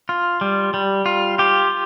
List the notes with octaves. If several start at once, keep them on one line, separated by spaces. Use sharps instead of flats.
F4
G3
G3
F4
F4 G4